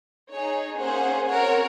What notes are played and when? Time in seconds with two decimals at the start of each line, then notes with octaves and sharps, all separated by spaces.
0.30 D#4 G#4 C#5
0.79 A#3 C#4 G#4 C5 F#5
1.28 C4 F#4 A#4 C#5 F#5